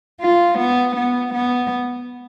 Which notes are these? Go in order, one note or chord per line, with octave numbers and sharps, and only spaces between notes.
F4
B3
B3
B3